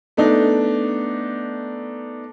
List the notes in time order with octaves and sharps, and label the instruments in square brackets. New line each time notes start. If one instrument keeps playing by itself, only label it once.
[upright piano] A3 B3 D4 D#4